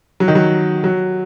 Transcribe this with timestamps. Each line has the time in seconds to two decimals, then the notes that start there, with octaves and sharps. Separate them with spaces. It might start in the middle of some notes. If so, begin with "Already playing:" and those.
0.20 F#3
0.28 D#3
0.35 F#3
0.84 F#3